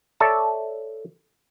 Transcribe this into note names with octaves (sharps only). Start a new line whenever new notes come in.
A4 C#5 D5 E5 A5